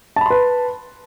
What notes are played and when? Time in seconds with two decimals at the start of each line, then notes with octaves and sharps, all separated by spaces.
0.16 A5
0.21 B5
0.26 C6
0.30 B4